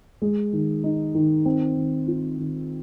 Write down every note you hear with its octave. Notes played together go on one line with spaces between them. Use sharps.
G#3
D#3
D#4
D#3
C4
D#3
F4
D#3